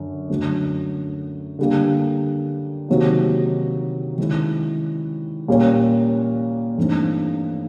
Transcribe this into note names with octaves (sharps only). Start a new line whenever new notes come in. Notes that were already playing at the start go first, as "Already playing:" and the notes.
Already playing: F#2 D3
F#2 D3 F#3 A3 C#4
D3 G3 A#3
C3 D#3 F#3 A#3 D#4
D#3 G#3 C#4 E4
A#2 G3 A#3 C#4
G2 E3 A3 C4 D#4